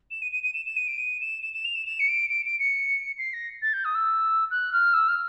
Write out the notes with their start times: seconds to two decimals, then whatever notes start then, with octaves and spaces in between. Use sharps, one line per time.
0.11 E7
0.22 D#7
0.32 D#7
0.43 D#7
0.54 E7
0.66 E7
0.77 D#7
0.88 D7
0.98 D#7
1.21 E7
1.42 E7
1.54 E7
1.65 F7
1.75 E7
1.87 E7
2.00 C#7
2.08 D7
2.30 D7
2.46 D7
2.59 C#7
3.19 C7
3.33 A#6
3.62 A6
3.73 G6
3.85 D#6
3.95 E6
4.51 F#6
4.73 F6
4.94 E6
5.08 F6